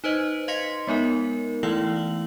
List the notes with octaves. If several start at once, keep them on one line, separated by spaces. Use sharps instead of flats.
D#4 B4 C5 D#5
D#5 F5 C6 B6 C#7
G#3 B3 D#4 A#4
E3 A3 E4 F5 E6 F#7